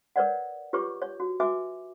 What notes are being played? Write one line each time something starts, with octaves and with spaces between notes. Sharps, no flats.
A#4 B4 C#5 D5 F#5
F4 G4 B4 C#5 C#6 D6
C#5
F#4
F#4 B4 E5 G#5 D6